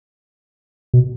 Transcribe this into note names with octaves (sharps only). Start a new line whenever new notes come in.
B2